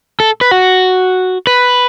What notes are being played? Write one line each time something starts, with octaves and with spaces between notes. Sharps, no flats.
A4
B4
F#4
B4